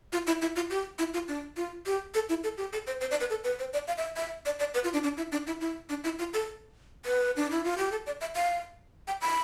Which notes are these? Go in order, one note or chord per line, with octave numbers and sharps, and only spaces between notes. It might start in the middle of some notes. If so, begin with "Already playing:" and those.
F4
E4
E4
F4
G4
E4
F4
D4
F4
G4
A4
E4
A4
G4
A4
C5
C5
D5
B4
A4
B4
C5
D5
F5
E5
E5
D5
D5
B4
F4
D4
D4
E4
D4
E4
E4
D4
E4
F4
A4
B4
D4
E4
F4
G4
A4
D5
E5
F5
G5
B5